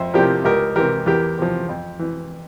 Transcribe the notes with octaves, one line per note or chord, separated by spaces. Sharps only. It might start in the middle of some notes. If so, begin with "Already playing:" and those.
Already playing: F2 C5 E5
C3 F3 G4 A#4
C#2 G4 A#4
C3 E3 G4 A#4
E2 G4 A#4
C3 F3
F2
E3